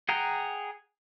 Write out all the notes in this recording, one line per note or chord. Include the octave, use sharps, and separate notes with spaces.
G#4 F#5 G5 A#5